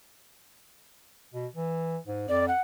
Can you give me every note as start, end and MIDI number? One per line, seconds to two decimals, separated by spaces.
1.34 1.47 47
1.55 1.97 52
2.07 2.26 44
2.29 2.50 41
2.29 2.46 74
2.48 2.61 78